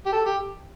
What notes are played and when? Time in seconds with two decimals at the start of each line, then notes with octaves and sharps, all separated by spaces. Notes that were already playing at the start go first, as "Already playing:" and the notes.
0.06 G4
0.13 A4
0.25 G4